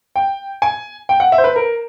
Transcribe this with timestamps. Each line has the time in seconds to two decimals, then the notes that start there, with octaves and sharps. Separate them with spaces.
0.16 G5
0.62 G#5
1.09 G5
1.20 F#5
1.32 E5
1.38 C5
1.44 B4
1.56 A#4